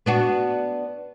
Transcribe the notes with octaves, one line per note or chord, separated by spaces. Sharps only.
B3 D4 F#4